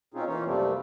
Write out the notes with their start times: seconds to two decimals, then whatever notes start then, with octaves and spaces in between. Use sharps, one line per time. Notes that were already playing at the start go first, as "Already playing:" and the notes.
0.14 B2 C4 C#4 D#4 F4 G#4
0.27 E3 A#3 C#4 D#4 F4 C#5
0.45 F#2 C3 G3 A3 A#3 C4